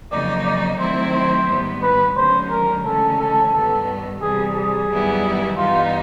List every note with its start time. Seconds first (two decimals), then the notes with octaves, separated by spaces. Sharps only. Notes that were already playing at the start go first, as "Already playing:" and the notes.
0.11 F2 C#3 F#3 A#3 D#4 D5
0.45 D5
0.79 D#3 F#3 A3 C4 E4 C5
1.14 C5
1.48 G#2 D#3 G3 B3
1.82 B4
2.16 D#2 D3 F#3 A3 C#4 C5
2.51 A#4
2.84 D2 C#3 E3 G#3 C#4 A4
3.19 A4
3.53 G2 D#3 G3 B3 A4
4.22 C3 E3 G3 G#4
4.56 G#4
4.89 F#2 D#3 G3 B3 E4
5.58 G2 E3 G3 B3 D#4 F4